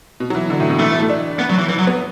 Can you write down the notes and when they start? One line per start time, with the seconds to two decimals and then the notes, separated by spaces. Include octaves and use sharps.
0.20 B2
0.30 F#3
0.35 E3
0.50 D3
0.60 A2
0.69 B2
0.79 E3 A3
0.90 E3
1.00 A3
1.10 D4
1.39 B3
1.50 F#3
1.59 E3
1.69 E3
1.79 F#3
1.87 B3